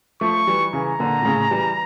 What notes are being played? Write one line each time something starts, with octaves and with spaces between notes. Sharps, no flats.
F3 A3 C#6
E3 G3
C#3 E3 A#5
A#2 D3
A#2
A2 C#3
E3 G3